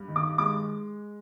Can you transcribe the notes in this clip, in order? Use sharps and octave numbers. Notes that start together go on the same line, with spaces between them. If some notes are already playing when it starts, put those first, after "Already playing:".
Already playing: G2
D#3
D6
G#3 D6